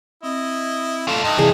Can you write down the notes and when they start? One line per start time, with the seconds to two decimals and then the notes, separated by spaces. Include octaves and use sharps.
0.23 C4 E4 D#5
1.07 A3 D4 F4
1.24 G2 D#4 D#5
1.38 C3 E3 G#4 D5